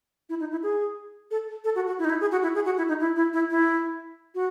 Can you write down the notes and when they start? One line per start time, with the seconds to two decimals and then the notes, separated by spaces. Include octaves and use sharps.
0.29 E4
0.40 D#4
0.51 E4
0.63 G#4
1.31 A4
1.64 A4
1.75 F#4
1.87 F#4
1.99 E4
2.05 D#4
2.10 E4
2.21 G#4
2.31 F#4
2.43 E4
2.55 G#4
2.65 F#4
2.77 E4
2.88 D#4
3.00 E4
3.16 E4
3.33 E4
3.50 E4
4.35 F#4